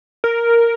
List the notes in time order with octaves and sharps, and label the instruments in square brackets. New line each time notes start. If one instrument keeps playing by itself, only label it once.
[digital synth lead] A#4